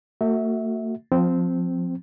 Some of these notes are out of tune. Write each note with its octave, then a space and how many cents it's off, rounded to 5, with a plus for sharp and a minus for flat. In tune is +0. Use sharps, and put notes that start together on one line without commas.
A3 +45 F#4 +0 E5 -25
F3 +15 C4 -10